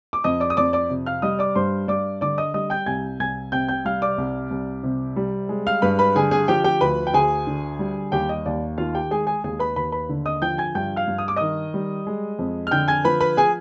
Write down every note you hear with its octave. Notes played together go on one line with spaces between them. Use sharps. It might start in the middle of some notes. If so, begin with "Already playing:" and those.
D6
F2 D#5 D#6
D5 D6
D#6
F2 D5 D6
D5 D6
C3
F5 F6
G3 D#5 D#6
D5 D6
G2 C5 C6
G2 D5 D6
D3 D5 D6
D#5 D#6
G3 D#5 D#6
G5 G6
C2 G#5 G#6
C2 G#5 G#6
C3 G5 G6
G5 G6
G3 F5 F6
D5 D6
C2
C2
C3
G3
G#3
F5 F6
G2 B4 B5
B4 B5
D3 G#4 G#5
G#4 G#5
F3 G4 G5
G4 G5
D2 B4 B5
G5
D2 G#4 G#5
D3
G3
D#2 G4 G5
D#5
D#2 D5
D#3 F4 F5
G4 G5
G#3 G#4 G#5
G#4 G#5
D#2 G#4 G#5
B4 B5
D#2 B4 B5
B4 B5
D3
D#5 D#6
F3 G5 G6
G#5 G#6
G2 G5 G6
F5 F6
G2
D#6
D6
D#3 D#5 D#6
G3
G#3
F2
F6
D3 G5 G6
G#5 G#6
F3 B4 B5
B4 B5
G#4 G#5